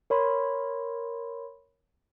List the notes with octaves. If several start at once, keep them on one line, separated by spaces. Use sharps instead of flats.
A#4 C#5 B5 C6